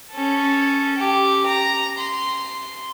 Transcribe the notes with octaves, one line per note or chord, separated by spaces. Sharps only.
C#4 A4
G4
A#5
C6